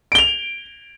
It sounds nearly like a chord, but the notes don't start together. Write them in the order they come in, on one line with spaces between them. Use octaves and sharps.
D7 G7 F7